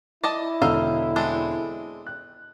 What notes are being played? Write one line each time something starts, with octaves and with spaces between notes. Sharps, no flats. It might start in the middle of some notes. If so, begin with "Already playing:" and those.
E4 D5 D#5 A5
E1 D3 D#4 F5 E6
G#3 C4 D4
F#6